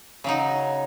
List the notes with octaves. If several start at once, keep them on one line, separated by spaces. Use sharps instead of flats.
C#3 F#3 D#4